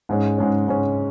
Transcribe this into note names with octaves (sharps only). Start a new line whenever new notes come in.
G#2 G#3 C#4
G#2 G#3 C#4
G#2 G#3 C#4